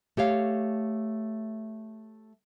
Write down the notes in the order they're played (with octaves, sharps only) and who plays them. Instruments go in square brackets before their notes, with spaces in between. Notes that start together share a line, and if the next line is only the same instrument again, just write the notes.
[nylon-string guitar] A3 G4 C#5 F5